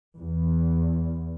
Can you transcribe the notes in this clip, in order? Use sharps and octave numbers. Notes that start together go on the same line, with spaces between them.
E2